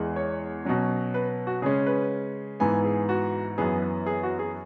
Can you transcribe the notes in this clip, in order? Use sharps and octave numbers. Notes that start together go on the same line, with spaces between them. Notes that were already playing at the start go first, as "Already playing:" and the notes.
Already playing: E2 E3 G#3
C#5
B2 F#3 C#4
B4
F#4
C#3 G#3 C#4 G#4
B4
G#2 E3 B3 G#5
G#4
F#4
F#2 E3 B3 G#4
B4
G#4
F#4
G#4